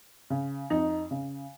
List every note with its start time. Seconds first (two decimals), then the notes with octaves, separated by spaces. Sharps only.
0.30 C#3
0.70 F2 D#4
1.11 C#3